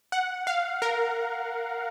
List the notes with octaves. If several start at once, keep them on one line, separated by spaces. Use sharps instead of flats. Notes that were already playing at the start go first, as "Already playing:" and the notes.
F#5
F5
A#4